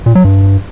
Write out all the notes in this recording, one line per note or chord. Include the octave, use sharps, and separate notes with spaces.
A#2
F#3
G2